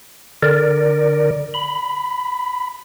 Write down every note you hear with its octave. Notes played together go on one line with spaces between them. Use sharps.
D3 A#4 D5
B5